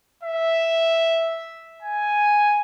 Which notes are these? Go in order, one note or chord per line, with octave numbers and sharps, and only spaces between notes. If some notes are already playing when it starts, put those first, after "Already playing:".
E5
G#5